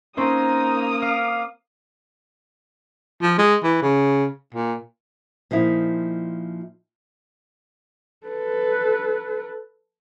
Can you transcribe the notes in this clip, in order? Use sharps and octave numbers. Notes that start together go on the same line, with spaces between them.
A#3 C4 C#4 D#4 C5 D#6
F5 D6 F6
F3
G#3
E3
C#3
A#2
A#2 F3 D#4 E4
A4 B4